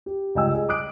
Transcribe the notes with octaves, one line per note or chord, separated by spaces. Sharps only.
G4
C#2 G2 D#5 G5 G#5 E6
G#4 D#5
D6 D#6 F#6 D7